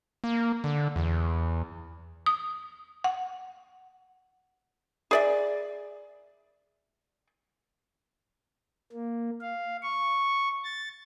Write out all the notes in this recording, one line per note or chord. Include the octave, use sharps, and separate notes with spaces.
A#3
D3
E2
D#6
F#5
G#4 D5 E5
A#3
F5
C#6
A6